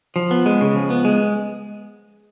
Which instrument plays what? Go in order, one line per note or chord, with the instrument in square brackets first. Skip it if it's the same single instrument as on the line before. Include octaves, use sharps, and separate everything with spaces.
[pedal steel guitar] F3
B3
G#3
C#3
F3
B3
G#3